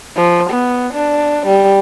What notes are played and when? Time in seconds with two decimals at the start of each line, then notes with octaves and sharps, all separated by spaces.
0.16 F3
0.50 B3
0.93 D4
1.47 G3